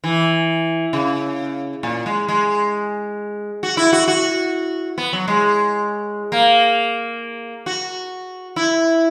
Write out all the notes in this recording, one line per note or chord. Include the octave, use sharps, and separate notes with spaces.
E3
C#3
A#2
G#3
G#3
F#4
E4
F#4
F#4
B3
F#3
G#3
A#3
F#4
E4